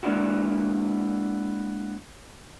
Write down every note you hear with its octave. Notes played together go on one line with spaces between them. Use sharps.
G#3 A#3 B3 D4 E4 F#4